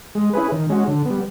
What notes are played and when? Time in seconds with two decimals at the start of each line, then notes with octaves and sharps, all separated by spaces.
0.15 G#3
0.33 C#4 E4 G#4 B4
0.52 D#3
0.69 G#3 C#4 F#4
0.88 D3
1.05 B3
1.10 G3